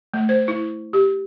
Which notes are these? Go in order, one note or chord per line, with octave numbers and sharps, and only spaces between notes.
A3
C5
E4
G4